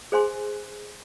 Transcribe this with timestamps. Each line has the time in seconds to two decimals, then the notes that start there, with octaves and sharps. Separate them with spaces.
0.12 G#4 C5 G#5 C6